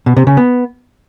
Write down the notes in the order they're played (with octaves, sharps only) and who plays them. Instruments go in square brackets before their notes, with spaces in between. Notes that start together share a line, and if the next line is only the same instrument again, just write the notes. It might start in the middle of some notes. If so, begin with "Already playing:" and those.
[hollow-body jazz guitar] B2
C3
C#3
B3